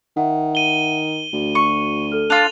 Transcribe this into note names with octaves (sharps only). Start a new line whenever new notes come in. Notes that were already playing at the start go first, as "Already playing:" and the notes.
D#3 E5 F#5
D#7 G7
D2 F#4
C#6
A4 F6
D4 F4 A6 F7